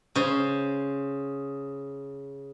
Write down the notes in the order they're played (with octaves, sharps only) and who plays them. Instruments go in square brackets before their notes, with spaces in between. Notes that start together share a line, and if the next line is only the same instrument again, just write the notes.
[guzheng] C#3 C5